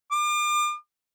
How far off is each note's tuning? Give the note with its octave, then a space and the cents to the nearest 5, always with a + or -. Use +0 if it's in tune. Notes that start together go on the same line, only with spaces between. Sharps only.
D6 +40